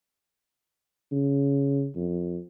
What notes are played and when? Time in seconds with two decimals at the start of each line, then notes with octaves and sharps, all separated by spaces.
1.12 C#3
1.96 F2